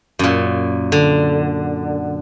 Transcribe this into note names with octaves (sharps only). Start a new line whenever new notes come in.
F#2 A#2
D3